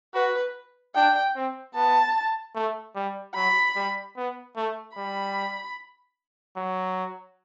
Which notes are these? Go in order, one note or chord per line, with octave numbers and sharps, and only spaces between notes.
F#4 B4
D4 G5
C4
B3 A5
A3
G3
F#3 B5
G3
B3
A3
G3 B5
F#3